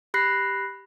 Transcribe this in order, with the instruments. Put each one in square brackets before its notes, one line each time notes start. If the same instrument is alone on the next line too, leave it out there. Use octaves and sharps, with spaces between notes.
[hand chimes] G4 B5 F#6 A#6 C7